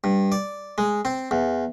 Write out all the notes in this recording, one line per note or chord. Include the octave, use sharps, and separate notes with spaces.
G2
D5
G#3
C4
E2